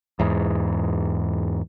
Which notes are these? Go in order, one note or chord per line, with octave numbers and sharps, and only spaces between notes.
E2 G#2